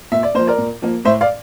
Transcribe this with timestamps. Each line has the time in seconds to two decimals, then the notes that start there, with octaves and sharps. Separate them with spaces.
0.12 A#2 E5
0.23 D5
0.35 F3 A#3 C5
0.47 A#4 D5
0.58 A#2
0.82 F3 A#3
1.05 A2 C5 E5
1.21 D5 F5